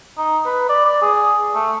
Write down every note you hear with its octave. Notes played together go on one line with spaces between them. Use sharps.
D#4
B4
D5
D5
G#4
A3